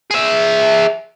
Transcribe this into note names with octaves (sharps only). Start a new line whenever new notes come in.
G#4 E5